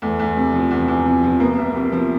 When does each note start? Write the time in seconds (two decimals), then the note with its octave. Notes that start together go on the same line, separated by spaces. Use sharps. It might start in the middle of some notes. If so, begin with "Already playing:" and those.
0.02 E2 A3
0.19 E2
0.36 C3
0.54 F3
0.71 E2
0.88 E2
1.06 C3
1.23 F3
1.40 A#3 B3
1.58 C2
1.75 C3
1.92 F3